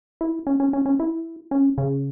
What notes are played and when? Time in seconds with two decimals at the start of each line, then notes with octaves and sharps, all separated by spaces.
0.21 E4
0.47 C#4
0.60 C#4
0.73 C#4
0.86 C#4
1.00 E4
1.51 C#4
1.78 C#3